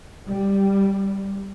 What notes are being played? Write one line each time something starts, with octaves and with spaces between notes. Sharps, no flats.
G3